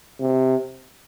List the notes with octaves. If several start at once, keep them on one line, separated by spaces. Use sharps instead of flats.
C3